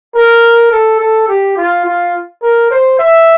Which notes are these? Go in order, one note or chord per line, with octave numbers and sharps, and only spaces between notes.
A#4
A4
A4
G4
F4
F4
A#4
C5
E5